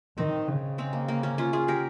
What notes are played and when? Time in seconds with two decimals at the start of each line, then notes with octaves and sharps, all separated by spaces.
0.18 D#3 C4 D#4
0.48 C#3
0.78 G#3 C4
0.93 A#3
1.08 A#3
1.23 A#3 C#4
1.38 C#4 F4
1.53 F4 G#4
1.68 G4 A#4